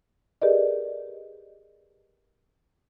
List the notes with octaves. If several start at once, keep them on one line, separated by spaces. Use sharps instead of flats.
G4 G#4 A#4 B4 D5 D#5